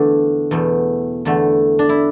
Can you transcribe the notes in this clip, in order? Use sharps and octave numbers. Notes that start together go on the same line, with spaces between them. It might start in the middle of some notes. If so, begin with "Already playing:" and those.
Already playing: E2 D3 A3 D4
E2 B2 A3
E2 D3 A3
D4
E4